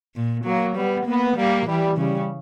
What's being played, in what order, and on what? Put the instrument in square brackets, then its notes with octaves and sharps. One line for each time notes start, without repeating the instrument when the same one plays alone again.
[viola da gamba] A#2
[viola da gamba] F#3 [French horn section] A#3
[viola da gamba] G3 [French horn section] B3
[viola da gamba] A#3 [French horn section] B3
[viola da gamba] G3 [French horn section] A#3
[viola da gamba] E3 [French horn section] G3
[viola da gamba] C#3 [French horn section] G3